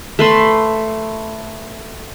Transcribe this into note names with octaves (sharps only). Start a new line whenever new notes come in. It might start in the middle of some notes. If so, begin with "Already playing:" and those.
A3 B4 C6